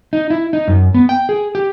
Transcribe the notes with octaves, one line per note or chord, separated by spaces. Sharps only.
D#4
E4
D#4
F#2
B3
G5
G#4
G4